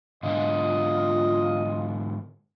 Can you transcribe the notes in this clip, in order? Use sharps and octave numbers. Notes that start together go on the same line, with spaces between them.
G#2 D3 F4 D#5